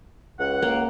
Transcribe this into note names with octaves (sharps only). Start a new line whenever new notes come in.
C#2 F#5
A#3